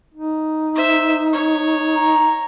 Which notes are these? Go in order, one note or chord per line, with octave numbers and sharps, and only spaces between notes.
D#4
C5 E5
C#5
A#5